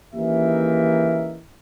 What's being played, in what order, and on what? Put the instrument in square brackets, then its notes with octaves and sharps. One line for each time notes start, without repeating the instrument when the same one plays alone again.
[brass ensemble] D#2 C#3 E3 D#4 A#4 E5